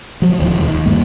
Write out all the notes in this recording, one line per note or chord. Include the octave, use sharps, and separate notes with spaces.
F3 F#3
D1 D#2 D#3 F3
E1
D#2
G2 G3 A3 A#3